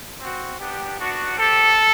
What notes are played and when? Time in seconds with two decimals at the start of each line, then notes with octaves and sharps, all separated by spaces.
0.20 C4 F#4
0.59 B3 D4 G4
0.98 B3 D4 F#4
1.37 C4 G4 A4